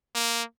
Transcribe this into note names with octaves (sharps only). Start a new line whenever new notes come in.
A#3